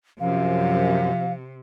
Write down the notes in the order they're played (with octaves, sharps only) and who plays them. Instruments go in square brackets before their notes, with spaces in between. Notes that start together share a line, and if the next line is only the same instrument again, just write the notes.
[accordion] F#2 [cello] C3 [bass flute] F3 [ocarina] F5